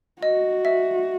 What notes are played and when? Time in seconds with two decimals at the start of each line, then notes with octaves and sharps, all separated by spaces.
0.23 F#4 D#5
0.65 E5